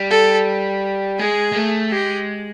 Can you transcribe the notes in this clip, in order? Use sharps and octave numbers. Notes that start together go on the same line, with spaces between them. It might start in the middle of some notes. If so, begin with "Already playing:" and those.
Already playing: G3
A4
G#3 G#4
G#3
A3
G#3 G4